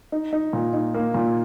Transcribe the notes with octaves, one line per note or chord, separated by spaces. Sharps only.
D#4
D#4
A#2
D#4
A#3
A#2